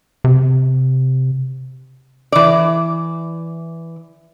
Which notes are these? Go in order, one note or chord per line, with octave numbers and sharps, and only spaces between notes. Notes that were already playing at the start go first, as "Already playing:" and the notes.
C3
E3 D5